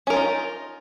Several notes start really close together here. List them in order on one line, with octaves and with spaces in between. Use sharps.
C#4 A#4 F4 D#4